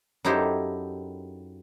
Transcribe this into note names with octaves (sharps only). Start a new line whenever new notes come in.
F#2 D#4 E4 G4 A4 C5